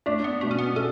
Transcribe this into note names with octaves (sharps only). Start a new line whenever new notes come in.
A3 D4
B3
B2 A3
C#4
B3
C#4 A4